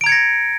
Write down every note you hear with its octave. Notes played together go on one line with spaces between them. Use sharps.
A#5 G#6 A#6 C#7 D7